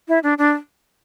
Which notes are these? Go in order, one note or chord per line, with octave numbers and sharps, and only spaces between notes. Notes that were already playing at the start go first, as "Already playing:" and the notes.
E4
D4
D4